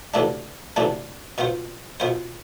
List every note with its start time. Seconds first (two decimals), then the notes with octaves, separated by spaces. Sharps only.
0.14 D2 C3 E3 A3 D4
0.76 D2 C3 E3 A3 D4
1.38 B2 B3 F4 C5
2.00 B2 B3 F4 C5